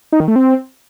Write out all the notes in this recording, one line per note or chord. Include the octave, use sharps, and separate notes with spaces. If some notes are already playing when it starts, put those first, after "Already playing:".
D#4
D#3
A3
C4